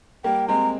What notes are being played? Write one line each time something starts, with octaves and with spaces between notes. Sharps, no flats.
G3 A#3 G5
G#3 C4 A#5